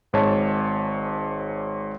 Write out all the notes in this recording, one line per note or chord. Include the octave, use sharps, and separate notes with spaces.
G#1 G#2 C#5 A5